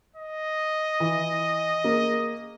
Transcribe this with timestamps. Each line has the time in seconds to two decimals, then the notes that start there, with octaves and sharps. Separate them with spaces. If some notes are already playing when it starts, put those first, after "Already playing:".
0.16 D#5
1.00 E3
1.84 A#3 G#4